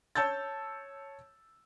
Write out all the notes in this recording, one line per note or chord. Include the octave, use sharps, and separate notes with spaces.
C#5 A5 E6 G6 A6